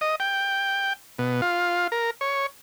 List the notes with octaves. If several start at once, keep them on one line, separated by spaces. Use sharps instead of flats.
D#5
G5
B2
F4
A#4
C#5